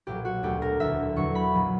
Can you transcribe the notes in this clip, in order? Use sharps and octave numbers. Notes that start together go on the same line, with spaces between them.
B1 A#2 F#3 G4
F#4
D2 D3 F#3 G4
A#4
E1 D2 D3 E5
E2 D3 F#3 C#6
B5
A#1 A#2 F#3